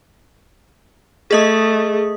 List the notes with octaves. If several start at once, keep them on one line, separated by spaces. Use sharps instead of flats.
A3 G#4 D#5 D#6